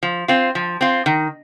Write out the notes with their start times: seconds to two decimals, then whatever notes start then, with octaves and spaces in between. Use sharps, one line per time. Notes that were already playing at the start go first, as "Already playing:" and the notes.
0.03 F3
0.28 C4 F4
0.55 F3
0.81 C4 F4
1.06 D#3